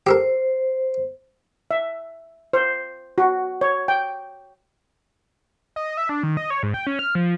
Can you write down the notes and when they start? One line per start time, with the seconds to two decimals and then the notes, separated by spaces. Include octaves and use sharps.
0.07 G4 A4 A#4 C5
1.71 E5
2.53 C5
3.18 F#4
3.61 C#5
3.88 G5
5.76 D#5
5.97 E5
6.09 D4
6.23 D#3
6.37 D#5
6.50 C#5
6.63 G#2
6.74 G5
6.87 C#4
6.99 F6
7.15 F3